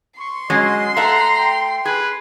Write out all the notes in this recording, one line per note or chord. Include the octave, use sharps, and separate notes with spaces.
C6 C#6
F#3 G#3 C#4 D#5
A3 E5 F#5 A#5
G5
G#4 B4